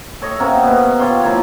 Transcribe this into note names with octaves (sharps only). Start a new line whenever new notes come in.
A4 C#5 D#5 E5
C3 A#3 B3 C#4
B2 B4
F4 G4 C#5 C6
F3 A#3 E4 C#5